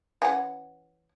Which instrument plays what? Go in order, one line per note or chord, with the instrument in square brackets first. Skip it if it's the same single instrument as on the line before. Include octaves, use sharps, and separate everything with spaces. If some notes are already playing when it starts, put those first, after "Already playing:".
[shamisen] E3 C#4 F#5